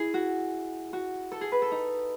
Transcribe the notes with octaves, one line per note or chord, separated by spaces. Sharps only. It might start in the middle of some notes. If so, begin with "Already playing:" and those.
Already playing: E4 G#4
F#4
F#4
A4
G#4
B4
A4
D#4